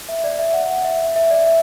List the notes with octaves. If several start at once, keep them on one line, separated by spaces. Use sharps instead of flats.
E5
D5
E5
F#5
E5
E5
D5
E5
E5